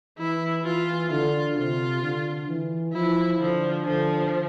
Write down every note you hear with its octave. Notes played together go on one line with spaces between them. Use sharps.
E3 E4
E3 F4
D3 F4
C3 F4
D3
E3
F3 E4
D3 F3
D3 F3